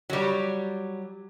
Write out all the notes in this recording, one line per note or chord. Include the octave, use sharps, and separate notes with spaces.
F#3 G3